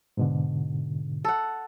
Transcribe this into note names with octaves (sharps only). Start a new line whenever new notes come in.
G#2 B2 D3
A4 F#5